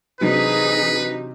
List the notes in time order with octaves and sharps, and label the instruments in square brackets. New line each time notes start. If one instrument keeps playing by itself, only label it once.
[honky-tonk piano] C3 F#3 D4 [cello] E3 D#4 [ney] G#4 [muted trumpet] B4